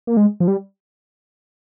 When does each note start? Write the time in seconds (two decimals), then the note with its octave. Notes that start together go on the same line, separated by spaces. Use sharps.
0.07 A#3
0.17 G#3
0.40 F3
0.48 G3